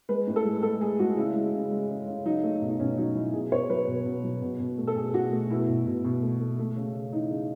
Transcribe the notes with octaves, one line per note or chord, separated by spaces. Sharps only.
G#3 B4
A2
A4
G#3
G#3 A4
G#3 G#4
G#3 F#4
C#3 E4
G#3
C#3
G#3
C#3
C#3
F#3 D#4
A3
B2
D#4
B2 C#4
F#3 D#4
F#3 E4
B2 G#4
B2 C#5
F#3 B4
B2
B2
F#3
B2
B2
A3
A4
B2 G#4
B2 F#4
A3
B2 E4
B2
B2
B2
A3
A3
A3
C#3
C#3
E3 D#4
C#3